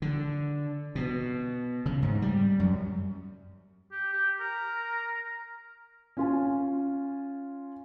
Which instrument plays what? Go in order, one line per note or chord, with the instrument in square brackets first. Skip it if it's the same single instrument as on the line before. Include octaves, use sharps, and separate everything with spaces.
[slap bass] D3
B2
C#3
G#2
G3
F#2
[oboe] G4
G4
A#4
[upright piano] C#4 F4 G#5